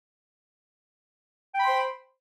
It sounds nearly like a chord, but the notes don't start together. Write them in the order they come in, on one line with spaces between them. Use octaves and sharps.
G5 B5 C6 C5